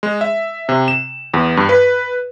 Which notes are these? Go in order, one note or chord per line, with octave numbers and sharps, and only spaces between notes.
G#3
E5
C3
E7
E2
G2
B4